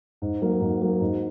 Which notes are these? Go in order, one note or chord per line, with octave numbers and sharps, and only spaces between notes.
G#2
F#3 A#3
G#2
F#3 A#3
G#2